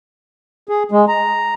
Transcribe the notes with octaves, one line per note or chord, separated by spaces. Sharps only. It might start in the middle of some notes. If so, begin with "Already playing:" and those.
G#4
G#3
A#5